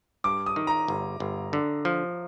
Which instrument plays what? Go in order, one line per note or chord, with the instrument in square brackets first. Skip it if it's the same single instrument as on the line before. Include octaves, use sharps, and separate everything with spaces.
[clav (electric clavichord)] G2 [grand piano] D6
[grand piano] D#6
[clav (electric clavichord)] D#3
[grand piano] A#5
[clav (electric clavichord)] G1
G1
D3
F3